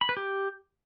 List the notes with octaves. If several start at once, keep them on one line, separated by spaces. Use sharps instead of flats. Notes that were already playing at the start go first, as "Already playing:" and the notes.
B5
B4
G4